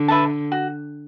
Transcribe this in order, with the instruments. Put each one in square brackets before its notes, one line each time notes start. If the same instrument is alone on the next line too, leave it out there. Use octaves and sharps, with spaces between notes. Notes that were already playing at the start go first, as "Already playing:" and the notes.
Already playing: [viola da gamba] D3
[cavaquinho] B4 E5 A5
F#4